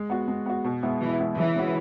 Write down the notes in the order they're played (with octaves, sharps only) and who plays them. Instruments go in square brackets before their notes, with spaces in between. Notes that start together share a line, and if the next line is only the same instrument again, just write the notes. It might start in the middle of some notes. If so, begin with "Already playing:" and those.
Already playing: [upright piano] G#3
B3 F#4
G#3
B3 F#4
B2
G#3 B3 E4
[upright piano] B2 [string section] E3
[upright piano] G#3 B3 E4
[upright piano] C#3 [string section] E3
[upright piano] G#3 C#4 F#4